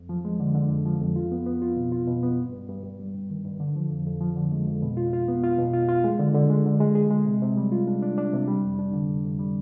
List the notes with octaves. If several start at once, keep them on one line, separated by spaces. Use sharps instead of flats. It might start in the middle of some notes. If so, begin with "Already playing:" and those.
Already playing: F2
F3
G#3
D3
D3
F2
F3
F2
F4
B3
B3
F4
B2
F4
B2
B3
G2
G2
G2
G2
G3
G2
D#3
G2
D3
F3
F2
F2
F3
D3
G#3
F2
B2
F4
F4
B3
F4
B2
F4
F4
G#3
D3
D3
G#3
D3
G#3
G#4
G#3
C3
C3
G3
F4
D4
D4
D4
C3
G3
F2
D4
D3
F2
F2
G3